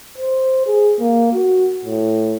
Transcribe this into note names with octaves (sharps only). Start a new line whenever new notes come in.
C5
G#4
A#3
F#4
A2